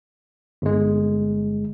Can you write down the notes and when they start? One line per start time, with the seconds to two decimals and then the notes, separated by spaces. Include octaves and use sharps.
0.62 G1 G#3